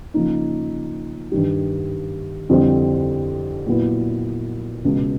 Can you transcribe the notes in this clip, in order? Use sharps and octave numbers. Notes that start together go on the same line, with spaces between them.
C#3 F3 A#3 D#4
G2 D#3 G3
F2 D3 G3 C4 E4
A#2 F#3 B3 E4
C#2 B2 G#3